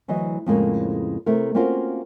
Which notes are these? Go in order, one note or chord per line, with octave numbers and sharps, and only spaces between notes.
D2 E3 F#3 D#5
F2 A2 C#3 G#3 A#3
C3 A3 E4 A#4
A#3 C4 C#4 F4 F#4 A#4